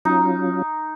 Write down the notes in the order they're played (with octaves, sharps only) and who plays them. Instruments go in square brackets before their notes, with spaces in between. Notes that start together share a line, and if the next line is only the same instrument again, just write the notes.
[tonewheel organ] F#3 C#4 F4 [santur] D#4